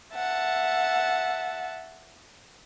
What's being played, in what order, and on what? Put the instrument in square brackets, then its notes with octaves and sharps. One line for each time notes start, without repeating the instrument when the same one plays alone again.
[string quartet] E5 F#5 A5